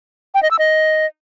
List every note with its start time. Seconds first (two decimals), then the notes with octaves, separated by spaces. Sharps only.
0.35 G5
0.43 D#5
0.51 E6
0.59 D#5